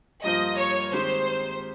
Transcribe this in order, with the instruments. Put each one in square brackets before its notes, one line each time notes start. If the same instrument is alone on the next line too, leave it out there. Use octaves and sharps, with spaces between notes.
[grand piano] G2 F3 A#3 F4 C5 [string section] D#5
[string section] C#5
[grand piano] D#3 G#3 C4 D#4 G4 [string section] C5